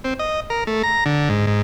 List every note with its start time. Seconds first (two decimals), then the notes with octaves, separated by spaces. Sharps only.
0.04 C4
0.19 D#5
0.50 A#4
0.67 A3
0.83 A#5
1.06 D3
1.29 G#2
1.47 G#2